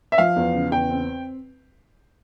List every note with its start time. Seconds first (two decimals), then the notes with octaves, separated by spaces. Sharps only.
0.12 E5
0.18 F3 F5
0.36 E2
0.54 C#3
0.71 E2 G5
0.90 C4